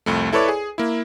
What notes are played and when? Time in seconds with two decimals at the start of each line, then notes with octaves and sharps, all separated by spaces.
0.06 C2 F2 A3
0.32 E4 A4 B4 C#5 D5
0.48 G#4
0.78 A#3 E4